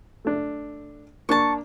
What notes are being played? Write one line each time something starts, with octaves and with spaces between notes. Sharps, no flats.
A3 D4
A#3 D4 A5 C#6